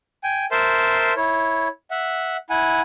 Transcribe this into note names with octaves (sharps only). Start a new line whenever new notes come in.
G5 G#5
A#4 C5 E5 A5 C6
E4 C#5
E5 F#5
E4 F#5 G#5